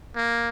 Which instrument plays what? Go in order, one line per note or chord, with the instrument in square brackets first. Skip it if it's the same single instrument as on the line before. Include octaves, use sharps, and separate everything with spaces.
[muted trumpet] A#3